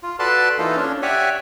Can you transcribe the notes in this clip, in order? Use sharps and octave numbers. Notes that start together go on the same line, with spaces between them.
F4
F#4 A4 B4 D5 A5 C6
E3 A#3 D#4 F4 A4
C#4 D4
G4 C#5 D5 E5 F#5 G#5